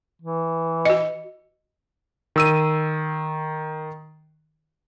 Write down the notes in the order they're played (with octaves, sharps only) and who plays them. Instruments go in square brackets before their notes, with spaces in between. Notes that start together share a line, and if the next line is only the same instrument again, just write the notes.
[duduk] E3
[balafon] F#4 D#5
[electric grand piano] D#3 E6 D#7